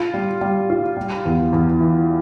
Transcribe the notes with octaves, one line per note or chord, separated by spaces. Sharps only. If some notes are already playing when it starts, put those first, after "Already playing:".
Already playing: F4
G3
G3
F4
G3
E2
E2
E3